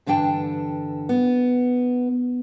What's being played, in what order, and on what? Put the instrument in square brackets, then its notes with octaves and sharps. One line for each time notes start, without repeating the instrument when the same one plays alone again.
[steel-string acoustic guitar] G2 D3 E3 D4 G5 A5
B3